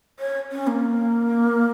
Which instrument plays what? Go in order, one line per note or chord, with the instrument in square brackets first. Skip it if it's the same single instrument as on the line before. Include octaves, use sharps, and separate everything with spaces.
[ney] C#5
C#4
A#3